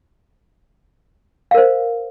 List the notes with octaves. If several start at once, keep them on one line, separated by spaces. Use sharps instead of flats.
A#4 C5 F5